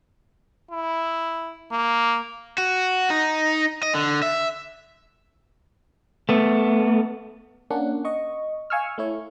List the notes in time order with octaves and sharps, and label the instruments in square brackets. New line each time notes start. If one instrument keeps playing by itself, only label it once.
[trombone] E4
A#3
[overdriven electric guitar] F#4
D#4
D#5
D3
E5
[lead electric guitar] A3 B3
[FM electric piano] A#3 C#4 D4 F#5
D#5 C#6
F5 G#5 C#6 E6 F6
A3 E4 C#5